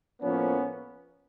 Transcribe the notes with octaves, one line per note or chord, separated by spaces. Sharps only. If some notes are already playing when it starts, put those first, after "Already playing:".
A2 F3 A#3 B3 C#4